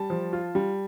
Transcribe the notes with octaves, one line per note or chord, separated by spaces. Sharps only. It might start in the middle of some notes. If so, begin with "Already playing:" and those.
Already playing: G3 A5
F3
F4
G3